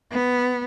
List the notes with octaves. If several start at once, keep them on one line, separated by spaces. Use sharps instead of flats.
B3